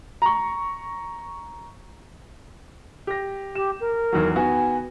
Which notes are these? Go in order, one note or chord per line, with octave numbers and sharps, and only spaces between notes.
A#5 C#6
G4 A#6
G4 E7
A#4
E2 D#3 F#3
D#3 B3 F#4 G#5